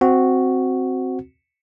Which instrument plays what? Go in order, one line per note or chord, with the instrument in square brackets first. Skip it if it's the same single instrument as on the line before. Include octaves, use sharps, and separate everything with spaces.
[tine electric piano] C4 F#4